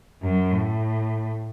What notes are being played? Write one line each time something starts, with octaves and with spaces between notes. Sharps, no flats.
F#2
A2